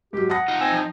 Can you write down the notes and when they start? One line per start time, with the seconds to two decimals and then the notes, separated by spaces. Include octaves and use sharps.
0.13 G#2 F#3 G4
0.30 F#5 A5 D#6 A#6
0.48 D#4 F4
0.61 C4 G#5 E6
0.72 F3